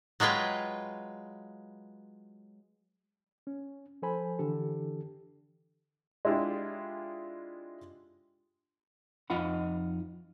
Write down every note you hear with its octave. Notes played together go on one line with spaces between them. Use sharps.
F#3 G#3 F4 B4 G5
C#4
F3 A4 C5 G#5 B5
D3 E3 D4 G4 A4
G#3 D4 E4 F4 G4 G#4
F2 D#4 F4 F#5 B5